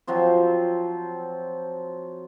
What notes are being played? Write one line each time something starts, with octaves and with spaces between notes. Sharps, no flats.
F3 F#3 C4